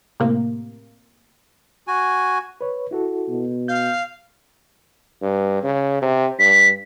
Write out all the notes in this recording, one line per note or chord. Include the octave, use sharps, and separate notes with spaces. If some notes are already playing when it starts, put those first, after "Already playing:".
A2 C3 A#3
F#4 G#5
B4 C#5
E4 F#4 A4
B2
F5 G6
G2
C#3
C3
G2 B6